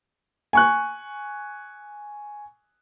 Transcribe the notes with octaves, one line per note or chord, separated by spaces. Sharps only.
G#5 C#6 F#6